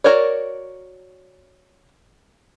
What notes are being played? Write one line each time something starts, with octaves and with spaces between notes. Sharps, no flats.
F#4 A#4 C#5 D5